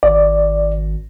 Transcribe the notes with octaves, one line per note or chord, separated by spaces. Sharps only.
G#1 D5